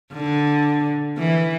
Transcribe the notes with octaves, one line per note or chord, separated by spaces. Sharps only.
D3
E3